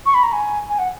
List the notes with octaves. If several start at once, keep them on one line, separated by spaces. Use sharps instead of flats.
C#6
B5
A#5
G#5
G#5
F#5